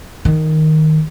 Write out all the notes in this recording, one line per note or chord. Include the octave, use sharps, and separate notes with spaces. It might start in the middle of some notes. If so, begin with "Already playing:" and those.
D#3